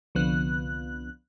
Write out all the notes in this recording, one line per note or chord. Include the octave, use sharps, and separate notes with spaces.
C2 D3 F3 B3 F#6